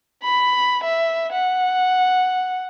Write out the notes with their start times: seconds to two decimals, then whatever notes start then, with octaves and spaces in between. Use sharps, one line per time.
0.23 B5
0.84 E5
1.33 F#5